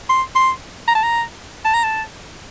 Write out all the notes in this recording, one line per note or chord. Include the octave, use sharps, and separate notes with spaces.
C6
C6
A#5
A5
A#5
A5
A#5
A5